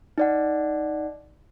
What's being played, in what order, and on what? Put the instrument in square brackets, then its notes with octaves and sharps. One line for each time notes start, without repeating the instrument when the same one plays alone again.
[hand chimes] D#4 D5 F#5